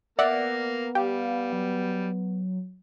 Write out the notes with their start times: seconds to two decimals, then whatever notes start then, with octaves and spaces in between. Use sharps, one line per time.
0.19 A#3 B3 A#4 D5 E5 F#5
0.95 G3 G4 F5
1.53 F#3